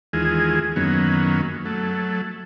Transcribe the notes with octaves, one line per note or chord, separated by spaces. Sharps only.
D#2 E3 G#3 F4 G#4
F#2 D#3 F#3 A#3 B3 C#4
F#3 A3